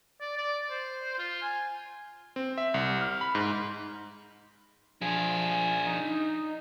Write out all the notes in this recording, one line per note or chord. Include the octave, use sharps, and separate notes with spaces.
D5
D5
C5
F4
G#5
C4
E5
C2
F6
B5
G#2
F3 D4 G#4
D#4